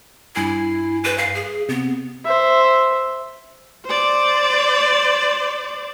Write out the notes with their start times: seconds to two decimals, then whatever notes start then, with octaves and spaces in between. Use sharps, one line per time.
0.36 G2 E4 G#5 C7
1.04 B4
1.18 F5
1.35 G#4 C7
1.69 C3 B3
2.25 C5 E5
3.85 C5 D5